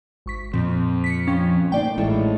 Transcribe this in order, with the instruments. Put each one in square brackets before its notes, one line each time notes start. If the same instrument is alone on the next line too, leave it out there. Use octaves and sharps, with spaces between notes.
[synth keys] G#1 C#6 B6
[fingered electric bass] F2 [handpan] A#2 [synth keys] C4
[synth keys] B6 C#7
F3 C#4 G5
[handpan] A3 A#3 D#4 [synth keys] C5 D5 G5
[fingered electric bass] A1 [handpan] G#3 E4 [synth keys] A4 C#5